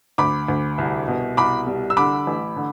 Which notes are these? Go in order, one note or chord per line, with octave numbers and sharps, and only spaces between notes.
D2 B5 D6
D2
C2
B2
C2 B5 D6
G3
E6
D3 B5 D6
A1
D3